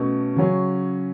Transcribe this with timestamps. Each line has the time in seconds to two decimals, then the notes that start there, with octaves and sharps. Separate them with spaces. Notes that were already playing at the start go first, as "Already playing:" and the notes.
Already playing: B2 A3 C#4
0.36 C#3 F#3 C#4